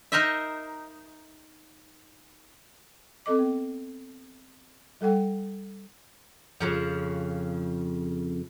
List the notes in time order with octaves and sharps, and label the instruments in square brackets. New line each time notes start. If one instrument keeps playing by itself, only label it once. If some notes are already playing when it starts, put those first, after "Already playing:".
[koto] D#4 A#4 C5 D#5 E5
[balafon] C4 A4 D#5 D6
B3
G3 A4 F#5 G5
[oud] F2 C#3 F3